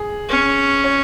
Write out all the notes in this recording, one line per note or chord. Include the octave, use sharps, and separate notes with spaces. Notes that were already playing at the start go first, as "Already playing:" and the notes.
Already playing: G#4
C#4
C#5